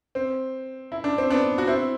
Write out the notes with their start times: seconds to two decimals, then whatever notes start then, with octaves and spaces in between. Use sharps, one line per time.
0.15 C4
0.92 E4
1.04 D4
1.18 C4
1.30 B3 D4
1.58 F#4
1.68 C4 E4